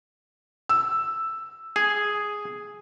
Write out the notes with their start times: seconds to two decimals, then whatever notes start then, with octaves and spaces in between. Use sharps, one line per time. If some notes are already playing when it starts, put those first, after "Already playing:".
0.69 E6
1.76 G#4